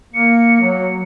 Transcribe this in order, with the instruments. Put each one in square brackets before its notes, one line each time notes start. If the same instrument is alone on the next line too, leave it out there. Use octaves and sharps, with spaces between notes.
[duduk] A#3 [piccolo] C#7
[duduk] F#3